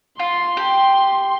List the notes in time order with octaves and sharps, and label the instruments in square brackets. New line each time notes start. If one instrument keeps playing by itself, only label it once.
[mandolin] F4 [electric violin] C6
[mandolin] G4